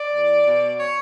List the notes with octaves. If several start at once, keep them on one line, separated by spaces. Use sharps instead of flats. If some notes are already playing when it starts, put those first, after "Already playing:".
Already playing: D5
E2
B2
C#5